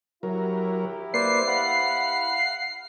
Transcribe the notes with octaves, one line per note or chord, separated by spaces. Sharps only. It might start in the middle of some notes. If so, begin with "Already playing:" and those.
F#3 E4 G4 A#4
A#3 B4 C5 D5 C7
F5 F#5 B5